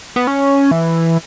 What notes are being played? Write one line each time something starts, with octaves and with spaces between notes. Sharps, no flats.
B3
C#4
E3